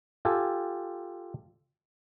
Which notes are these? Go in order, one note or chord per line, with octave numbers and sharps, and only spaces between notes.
F4 G4 A4 G#5